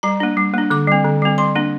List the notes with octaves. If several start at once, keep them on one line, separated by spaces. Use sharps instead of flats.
G3 A#5
A#3 D4
G3
A#3 D4
D3 D6
G3 C4
D3
G3 C4
G3 C6
A#3 D4